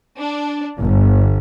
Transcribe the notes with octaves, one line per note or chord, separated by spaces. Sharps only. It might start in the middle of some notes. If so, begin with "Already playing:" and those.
D4
G1